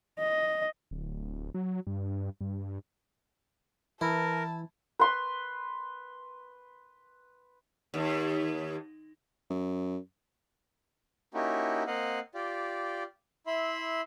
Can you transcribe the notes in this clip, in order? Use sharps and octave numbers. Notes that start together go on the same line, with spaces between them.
D#5
D1
F#3
G2
G2
E3 E4 A#4 A5
B4 C6
D#2
F#2
A#3 C#4 D#4 E4 F#4 G4
A#3 C4 D#5 F5 F#5
F4 G4 D5
E4 E5 B5 C6